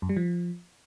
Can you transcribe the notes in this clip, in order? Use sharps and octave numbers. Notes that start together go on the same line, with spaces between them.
F#2
G3
F3